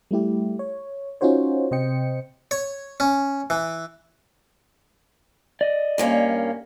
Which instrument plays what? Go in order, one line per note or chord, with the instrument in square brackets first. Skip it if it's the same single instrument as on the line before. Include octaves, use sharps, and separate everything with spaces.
[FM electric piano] G3 A3 E4 G4
C#5
C#4 D#4 F4 F#4 C5 C#5
C3 C5 D#5 G5 C#7
[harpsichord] C#5
C#4
E3
[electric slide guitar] D5 D#5
[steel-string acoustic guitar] G2 A#3 C#4